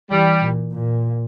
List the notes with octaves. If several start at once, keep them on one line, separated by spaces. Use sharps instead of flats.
E3 G3
A#2
A#2